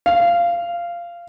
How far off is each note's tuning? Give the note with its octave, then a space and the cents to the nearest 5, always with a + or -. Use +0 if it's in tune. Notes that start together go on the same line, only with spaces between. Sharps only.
F5 -15